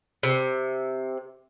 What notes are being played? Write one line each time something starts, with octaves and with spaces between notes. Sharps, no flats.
C3